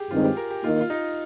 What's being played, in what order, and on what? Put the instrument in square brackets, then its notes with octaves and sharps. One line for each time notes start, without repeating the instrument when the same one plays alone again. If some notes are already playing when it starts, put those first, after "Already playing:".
Already playing: [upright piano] G4 G#4
[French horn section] G2 D#3 G#3 C4 D#4 [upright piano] F4
[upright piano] G4
A#4
G4
[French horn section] D#3 A#3 D#4 [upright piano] F4
[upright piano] F4
D#4